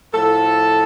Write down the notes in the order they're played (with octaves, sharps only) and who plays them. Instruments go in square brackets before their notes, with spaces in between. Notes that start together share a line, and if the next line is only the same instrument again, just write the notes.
[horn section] A2 F3 A4